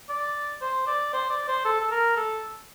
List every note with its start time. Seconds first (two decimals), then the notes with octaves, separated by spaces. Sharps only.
0.09 D5
0.61 C5
0.87 D5
1.13 C5
1.30 D5
1.48 C5
1.65 A4
1.81 A4
1.91 A#4
2.17 A4